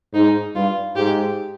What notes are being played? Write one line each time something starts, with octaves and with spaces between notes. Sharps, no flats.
G#2 D#4
G2 F4
G#2 G4